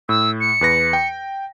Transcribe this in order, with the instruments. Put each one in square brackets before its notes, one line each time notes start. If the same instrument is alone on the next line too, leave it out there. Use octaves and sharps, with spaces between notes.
[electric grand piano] A2 [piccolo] E6
[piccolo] C#7
[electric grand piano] E2 B4 A#6
G5